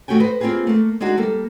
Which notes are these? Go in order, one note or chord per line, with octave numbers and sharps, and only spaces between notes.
D#3 A3 F#4 G4 G5 G#5
B4 C5 D#5
A#3 C4 F4 G4 G#4 B4
A3 A#3
G#3 D4 D#4 F#4 G#4
G3 A#3 A4